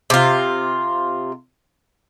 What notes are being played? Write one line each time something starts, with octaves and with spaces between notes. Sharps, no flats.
C3 F4